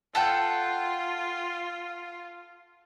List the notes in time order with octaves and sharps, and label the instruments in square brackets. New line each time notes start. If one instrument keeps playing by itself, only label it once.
[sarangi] F4 [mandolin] A4 F#5 G5